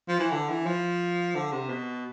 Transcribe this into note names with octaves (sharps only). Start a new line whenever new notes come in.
F3
E3
D3
E3
F3
D3
C3
B2